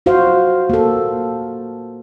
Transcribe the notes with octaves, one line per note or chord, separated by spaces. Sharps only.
F4 F#4 C5 F5
A#3 A4